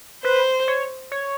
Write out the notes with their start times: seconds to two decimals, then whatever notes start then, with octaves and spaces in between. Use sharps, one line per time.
0.24 B4 C5
0.68 C#5
1.12 C#5